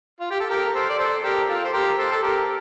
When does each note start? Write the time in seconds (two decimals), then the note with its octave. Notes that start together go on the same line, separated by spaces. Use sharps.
0.20 F4
0.31 G4
0.40 A4
0.50 G4 A#4
0.75 A4 C5
0.89 D5
0.99 A4 C5
1.24 G4 A#4
1.49 F4 A4
1.64 C5
1.73 G4 A#4
1.99 A4 C5
2.12 A4
2.23 G4 A#4